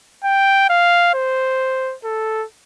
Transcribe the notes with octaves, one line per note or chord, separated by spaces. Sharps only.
G5
F5
C5
A4